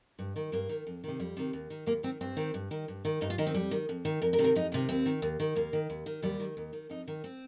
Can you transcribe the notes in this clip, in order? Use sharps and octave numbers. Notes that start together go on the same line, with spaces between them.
G2
D#3
G2 A#3
D#3
F2
C3 D#3
F2 G3
C3 D#3
D#2
D#3
D#2 A#3
D#3 C4
G2 C4
D#3
G2
D#3
G2
D#3
G2 D#4
F4
D#3 D#4
C4
F2 G3
D#3
F2
D#3
F2 A#4
A#4
C3 D#3
A#4
F2 D#4
C3 D#3
D#2 C4
D#3
D#2
D#3
D#2 A#3
D#3
D#2
D#3
D#2 G3
D#3
D#2
D#3
F2 D#4
D#3
C4